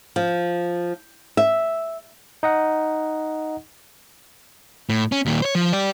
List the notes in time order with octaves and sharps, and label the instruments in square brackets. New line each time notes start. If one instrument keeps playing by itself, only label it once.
[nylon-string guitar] F3
E5
[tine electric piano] D#4 D#5 F#5
[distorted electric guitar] A2
C#4
D#2 A#2
C5 C#5
F3
G4 D5